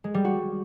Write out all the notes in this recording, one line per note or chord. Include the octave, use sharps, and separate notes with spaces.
G#3
G3
F#4